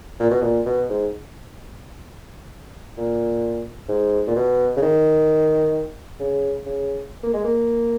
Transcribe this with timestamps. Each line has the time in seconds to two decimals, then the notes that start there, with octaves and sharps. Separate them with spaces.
0.20 A#2
0.31 B2
0.42 A#2
0.66 B2
0.90 G#2
2.98 A#2
3.89 G#2
4.27 A#2
4.36 B2
4.77 C#3
4.82 D#3
6.20 C#3
6.66 C#3
7.23 A#3
7.34 G#3
7.45 A#3